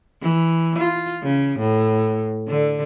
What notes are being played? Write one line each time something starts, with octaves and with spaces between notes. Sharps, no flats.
E3
F4
C#3
A2
D3